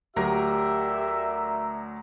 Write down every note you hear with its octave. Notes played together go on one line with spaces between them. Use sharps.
D2 F#3 G4 A#4 D5 E5